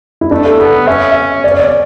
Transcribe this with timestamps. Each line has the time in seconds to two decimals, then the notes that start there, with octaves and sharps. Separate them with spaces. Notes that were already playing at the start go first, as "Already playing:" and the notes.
0.21 E4
0.31 A3 D4
0.46 A4
0.59 B3 A4
0.87 C#4 E5
1.12 E5
1.44 D5
1.51 C#5
1.60 D5